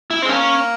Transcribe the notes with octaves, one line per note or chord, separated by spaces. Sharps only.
E4
C4
G#3
A#3 C#4